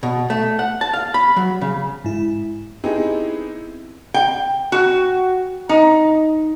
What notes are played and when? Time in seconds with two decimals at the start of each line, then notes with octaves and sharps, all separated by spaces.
0.03 B2
0.30 A3
0.59 F#5
0.81 A5
0.94 F5
1.14 B5
1.36 F#3
1.61 C#3
2.04 G#2 E4
2.84 B3 C4 D#4 E4 G4 G#4
4.14 G5
4.72 F#4
5.69 D#4